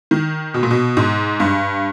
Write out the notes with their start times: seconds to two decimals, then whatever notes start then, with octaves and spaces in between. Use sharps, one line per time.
0.11 D#3
0.54 B2
0.63 A#2
0.71 B2
0.97 G#2
1.40 G2